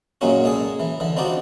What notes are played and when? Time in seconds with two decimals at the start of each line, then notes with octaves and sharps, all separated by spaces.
0.21 F#2 A#2 G#3 A#3 C#4 F#4
0.44 G#3 G#4 A4
0.80 E3
1.00 D3 E3
1.17 C4 D4 D#4 F4 F#4 D5